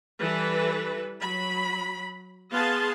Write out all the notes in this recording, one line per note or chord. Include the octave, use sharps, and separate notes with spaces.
E3 G3 A4 B4
F#3 B5
B3 G#4 F5 A5 C6